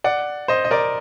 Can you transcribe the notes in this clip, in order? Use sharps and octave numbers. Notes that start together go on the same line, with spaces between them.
D5 F#5
C5 D#5
D#5
A#4 D5